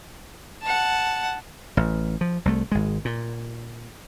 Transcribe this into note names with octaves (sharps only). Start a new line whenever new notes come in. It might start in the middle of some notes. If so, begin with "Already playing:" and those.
F#5 A5
A1
F3
C2 A3
G#1 G#3
A#2